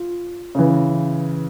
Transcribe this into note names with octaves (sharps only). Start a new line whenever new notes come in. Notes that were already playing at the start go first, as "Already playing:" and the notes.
Already playing: F4
C#3 E3